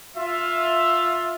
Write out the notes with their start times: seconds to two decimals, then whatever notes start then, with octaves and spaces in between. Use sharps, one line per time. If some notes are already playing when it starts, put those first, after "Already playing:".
0.16 F4 E5